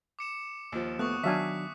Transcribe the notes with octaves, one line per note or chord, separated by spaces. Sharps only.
D6 C#7 E7
D#2 F3
A3 B3 C#6 D#6 F#6
D#3 F#3 D4 E5 F5 G#5 A5 B6